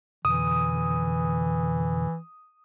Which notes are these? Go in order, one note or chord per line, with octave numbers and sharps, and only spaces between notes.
F2 B2 D3 E3 D#6